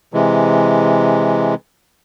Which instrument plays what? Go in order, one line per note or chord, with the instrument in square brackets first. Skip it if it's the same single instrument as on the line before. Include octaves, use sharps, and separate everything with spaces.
[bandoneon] C3 E3 G#3